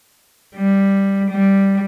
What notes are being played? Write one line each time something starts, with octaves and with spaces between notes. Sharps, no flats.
G3
G3